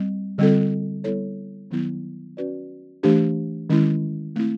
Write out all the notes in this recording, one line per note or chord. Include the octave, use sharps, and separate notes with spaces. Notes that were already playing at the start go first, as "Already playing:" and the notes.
Already playing: G3 C4
D3 G3 C4 F4 A4
G3 B3 E4 A4 C#5
D#3 F#3 B3 E4
C#4 F#4 B4 D5
E3 A3 D4 G4
D#3 G#3 C#4 E4
A3 C4 E4